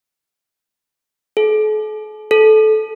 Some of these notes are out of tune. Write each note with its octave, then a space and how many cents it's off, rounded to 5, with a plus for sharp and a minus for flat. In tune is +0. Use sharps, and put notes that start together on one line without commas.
A4 -45
A4 -20